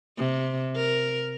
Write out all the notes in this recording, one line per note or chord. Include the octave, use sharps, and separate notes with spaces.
C3
A#4